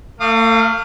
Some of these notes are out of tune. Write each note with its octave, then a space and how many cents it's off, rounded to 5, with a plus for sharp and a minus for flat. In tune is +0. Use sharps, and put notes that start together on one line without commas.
A3 +45 F5 +0 D#6 -35